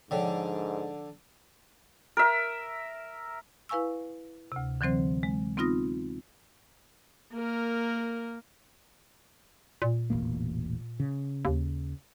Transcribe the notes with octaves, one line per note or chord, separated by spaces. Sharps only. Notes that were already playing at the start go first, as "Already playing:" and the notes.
G#2 D3 F3 C#5 G5
A#4 E5
E4 B4 F5 G#5 C#6 E6
D2 C3
D3 E3 F#3 C4 C5
G#3
B3 C4 D#4 F4 D#6 A#6
A#3 A#4
A#2
E1 A1 A#3
C#3
D#2